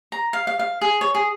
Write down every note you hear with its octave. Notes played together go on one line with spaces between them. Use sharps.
A#5
F5
F5
F5
G#4
C#5
G#4